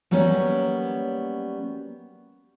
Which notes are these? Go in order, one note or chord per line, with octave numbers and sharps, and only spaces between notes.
F#3 G3 A#3 B3 C#4